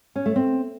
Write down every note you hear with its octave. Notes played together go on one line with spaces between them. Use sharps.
C#4
A3
C4